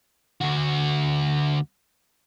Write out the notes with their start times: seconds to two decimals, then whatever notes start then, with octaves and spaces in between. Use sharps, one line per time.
0.41 D2 F#4